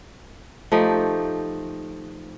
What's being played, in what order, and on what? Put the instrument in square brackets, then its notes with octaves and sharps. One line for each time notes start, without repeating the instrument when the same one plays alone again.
[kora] F3 A3 D#4 G4